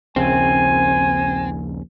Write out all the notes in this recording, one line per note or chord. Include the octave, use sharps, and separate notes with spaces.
D#1 A#1 C#3 C4 G#5